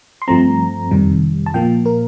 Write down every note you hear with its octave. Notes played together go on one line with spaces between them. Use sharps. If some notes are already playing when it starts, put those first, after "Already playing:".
C6
G2 F3 A3 C4 A#5
F2 C3 D#3 G3
A5
A#2 F3 A#3 G5
A#4